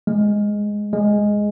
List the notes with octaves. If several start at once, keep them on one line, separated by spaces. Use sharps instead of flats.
G#3
G#3